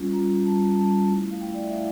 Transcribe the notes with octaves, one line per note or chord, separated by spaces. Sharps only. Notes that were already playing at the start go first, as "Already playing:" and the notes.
Already playing: G3 C#4 F4
G3 C#4 F4 A#5
G3 C#4 F4 A5
G3 C#4 F4 A5
A3 E4
F5
A3 E4 G5
D5
E5
A3 E4 F5